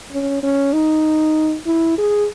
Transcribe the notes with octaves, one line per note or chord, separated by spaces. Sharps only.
C#4
C#4
D#4
E4
G#4